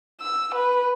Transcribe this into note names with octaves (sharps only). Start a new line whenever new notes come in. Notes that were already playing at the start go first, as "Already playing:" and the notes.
E6
B4